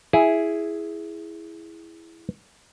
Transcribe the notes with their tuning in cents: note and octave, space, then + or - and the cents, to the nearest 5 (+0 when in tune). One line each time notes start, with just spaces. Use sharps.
E4 +0 G#4 +0